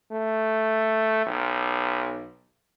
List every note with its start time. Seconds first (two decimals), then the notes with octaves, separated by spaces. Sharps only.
0.12 A3
1.26 B1